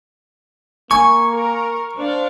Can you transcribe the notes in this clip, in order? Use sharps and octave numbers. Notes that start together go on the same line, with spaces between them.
A#3 G#5 C#6
A#4
D4 C5 F5